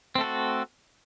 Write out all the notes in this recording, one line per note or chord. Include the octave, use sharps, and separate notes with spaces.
A3 C4 F#4 A4